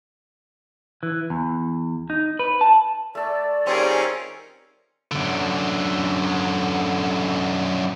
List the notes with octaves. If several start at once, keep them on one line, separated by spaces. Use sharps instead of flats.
E3
E2
D#4
B4
A5
A3 A4 D5
D#3 G3 C4 C#4 F4 G#4 A#4
F#2 D3